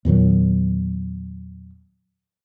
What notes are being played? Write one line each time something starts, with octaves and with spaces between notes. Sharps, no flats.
E2 A#2 D#3 F#3